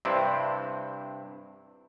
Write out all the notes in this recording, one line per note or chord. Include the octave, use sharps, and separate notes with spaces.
G2 C3 C4 D4 E4